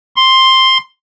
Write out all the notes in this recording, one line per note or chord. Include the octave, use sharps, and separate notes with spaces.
C6